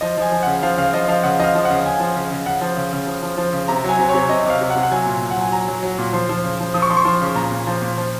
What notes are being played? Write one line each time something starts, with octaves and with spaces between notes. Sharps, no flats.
F3 D#5
F3 G#5
F3
C#3 F#5
F3 F5
C#3 F5
F3 D#5
F3 F5
C#3 F#5
F3 D#5 F5
F3
F#5
C#3
C#3 G#5
F3
C#3
C#3
C#3 F#5
F3
C#3
C#3
F3
F3
F3
C#3
C3 A#5
F#3 G#5
C3
C3 C#5
C3 D#5
C3 F5
C3
F#5
C3
F#5
F#3 G#5
A#2
A#2
F#5
F#3 G#5
F#3 A#5
F#3
F#3
A#2
F3 C6
F3
C#3
F3
F3 D#6
C#6
F3 C6
C#6
F3
C#3
A#2 A#5
A#2
F3
A#2
F3